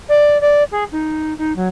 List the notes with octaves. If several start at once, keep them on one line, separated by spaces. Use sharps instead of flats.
D5
D5
G#4
D#4
D#4
F#3